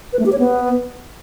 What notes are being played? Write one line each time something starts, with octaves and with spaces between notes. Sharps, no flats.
B4
A3
G4
C#5
B3